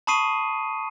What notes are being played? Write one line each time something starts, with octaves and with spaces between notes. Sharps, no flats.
A5 B5 C#6 D#6 C7 D#7